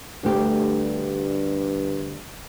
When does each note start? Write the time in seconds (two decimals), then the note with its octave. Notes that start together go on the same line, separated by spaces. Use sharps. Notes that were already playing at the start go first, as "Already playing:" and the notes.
0.24 D2 G2 A3 G4